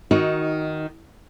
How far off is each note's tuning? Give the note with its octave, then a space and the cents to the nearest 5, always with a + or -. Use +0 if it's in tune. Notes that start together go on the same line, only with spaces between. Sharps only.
D#3 +5 D#4 +20 F#4 +0